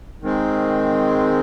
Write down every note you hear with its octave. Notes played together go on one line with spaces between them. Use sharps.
D#3 G#3 C4